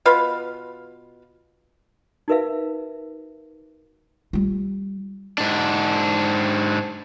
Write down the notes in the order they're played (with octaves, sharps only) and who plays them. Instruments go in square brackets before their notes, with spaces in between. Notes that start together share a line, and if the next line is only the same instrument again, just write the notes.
[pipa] B2 F4 B4 F5
[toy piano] D#4 F#4 A#4 B4 E5 F5
[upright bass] G3 F4
[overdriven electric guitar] G#2 D4